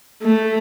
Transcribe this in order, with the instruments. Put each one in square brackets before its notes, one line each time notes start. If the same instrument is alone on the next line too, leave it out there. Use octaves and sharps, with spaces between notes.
[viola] A3